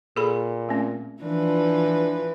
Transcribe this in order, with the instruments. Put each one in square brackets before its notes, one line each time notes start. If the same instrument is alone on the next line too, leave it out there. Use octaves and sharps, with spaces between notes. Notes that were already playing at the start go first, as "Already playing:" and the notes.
[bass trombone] A#2 [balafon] G#4 A4 B5
[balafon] A3 C4 C#4
[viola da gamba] E3 F3 B4 [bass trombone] D4